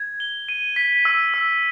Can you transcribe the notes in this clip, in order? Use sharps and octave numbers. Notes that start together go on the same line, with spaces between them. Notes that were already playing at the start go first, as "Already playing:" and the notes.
Already playing: G#6
G7
D#7
B6
E6
E6